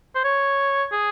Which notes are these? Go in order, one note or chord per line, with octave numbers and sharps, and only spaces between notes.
C5
C#5
G#4